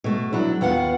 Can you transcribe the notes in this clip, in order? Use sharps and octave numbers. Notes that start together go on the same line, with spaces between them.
B2 A3
F#3 D4 E4
D#2 B3 F4 F#5